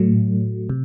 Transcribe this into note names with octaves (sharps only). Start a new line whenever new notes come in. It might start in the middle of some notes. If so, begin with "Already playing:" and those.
Already playing: A2 F#3 A3
C3